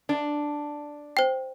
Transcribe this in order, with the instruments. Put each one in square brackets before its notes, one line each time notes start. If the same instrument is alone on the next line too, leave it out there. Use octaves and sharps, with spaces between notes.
[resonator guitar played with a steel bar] D4
[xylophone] C5 G5